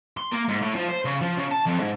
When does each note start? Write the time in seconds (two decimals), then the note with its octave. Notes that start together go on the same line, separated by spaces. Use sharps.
0.17 C6
0.32 A#3
0.49 G#2
0.62 A2
0.75 F3
0.89 C5
1.05 C#3
1.21 F3
1.37 C#3
1.51 A5
1.66 F2
1.80 G#2